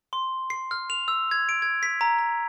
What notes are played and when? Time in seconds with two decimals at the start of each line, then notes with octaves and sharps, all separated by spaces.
0.13 C6
0.50 C7
0.71 F6
0.90 F7
1.08 E6
1.31 G#6
1.49 D7
1.62 G#6
1.83 B6
2.01 A#5
2.19 A#5